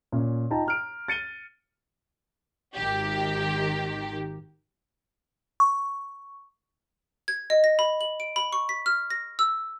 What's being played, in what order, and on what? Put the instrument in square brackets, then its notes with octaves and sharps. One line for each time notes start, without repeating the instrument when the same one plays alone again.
[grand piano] A#2 C#4
D#4 F4 G5 A5 A#5
A#5 F6 D7
A6 C#7 D#7 G7
[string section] G#1 D#3 G4
[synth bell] C#6
[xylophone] G#6
D#5
A#6
B5
F#7
D7
B5
C#6
B6
F6
A#6
E6